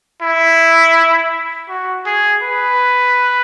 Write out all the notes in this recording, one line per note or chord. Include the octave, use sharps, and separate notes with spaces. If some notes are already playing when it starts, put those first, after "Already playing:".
E4
F#4
G#4
B4